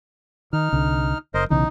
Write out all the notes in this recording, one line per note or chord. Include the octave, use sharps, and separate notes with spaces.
D#3 D#4 F6
C2 D3
F#1 A#4 C5 D#5
B1 C#3 E3 D#4